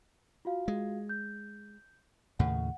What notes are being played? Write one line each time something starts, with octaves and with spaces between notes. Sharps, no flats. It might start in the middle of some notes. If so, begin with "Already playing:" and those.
F4 F#4 F5
G#3
G6
D#2 A2 C#3 F#5